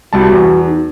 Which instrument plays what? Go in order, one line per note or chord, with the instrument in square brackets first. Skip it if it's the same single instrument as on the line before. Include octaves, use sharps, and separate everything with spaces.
[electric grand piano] C2 G3 A5 [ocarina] F#4
[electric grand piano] E2
[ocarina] D#4